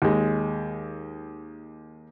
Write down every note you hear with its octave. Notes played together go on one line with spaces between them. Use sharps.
D#2 G#3